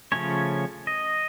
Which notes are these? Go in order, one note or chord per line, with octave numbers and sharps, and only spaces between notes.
C#3 F3 A3 C#4 C#5
D#5